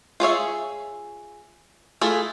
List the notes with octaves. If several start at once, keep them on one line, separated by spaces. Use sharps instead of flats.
F4 G#4 C#5 E5
A3 E4 F4 G#4 A4